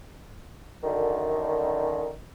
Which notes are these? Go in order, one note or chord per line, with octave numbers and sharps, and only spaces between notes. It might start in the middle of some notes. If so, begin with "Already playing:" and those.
F#2 D3 D#3